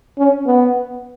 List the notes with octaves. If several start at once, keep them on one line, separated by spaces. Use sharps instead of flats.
C#4
B3